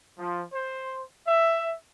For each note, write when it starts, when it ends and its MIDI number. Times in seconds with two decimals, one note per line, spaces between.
0.18 0.41 53
0.53 1.01 72
1.27 1.75 76